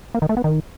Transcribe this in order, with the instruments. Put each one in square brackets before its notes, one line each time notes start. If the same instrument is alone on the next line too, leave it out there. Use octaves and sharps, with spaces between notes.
[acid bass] A#3
D#3
A3
B3
D#3